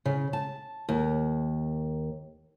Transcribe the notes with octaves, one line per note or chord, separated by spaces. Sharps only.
C#3
A5
D#2